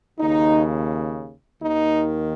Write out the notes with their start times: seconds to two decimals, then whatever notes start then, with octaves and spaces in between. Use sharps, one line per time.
0.19 D#2 C#3 D#4
1.62 D#2 D#3 D#4